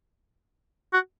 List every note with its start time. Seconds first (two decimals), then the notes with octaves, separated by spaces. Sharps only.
0.93 F#4